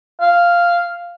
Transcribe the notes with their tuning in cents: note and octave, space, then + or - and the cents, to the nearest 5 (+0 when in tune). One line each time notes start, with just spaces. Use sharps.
F5 -5